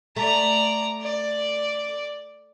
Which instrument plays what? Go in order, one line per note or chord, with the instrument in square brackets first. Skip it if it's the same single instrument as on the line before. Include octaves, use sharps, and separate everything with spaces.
[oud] A3 [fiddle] D5 A#5
[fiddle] D5